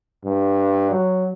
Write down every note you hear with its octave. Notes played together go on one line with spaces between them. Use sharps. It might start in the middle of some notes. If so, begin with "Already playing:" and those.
G2
F#3